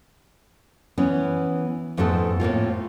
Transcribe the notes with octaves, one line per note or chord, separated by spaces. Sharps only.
E3 B3 C#4
F2 G#2 A3 B3 F#4 A4
A2 A#3 C4 F4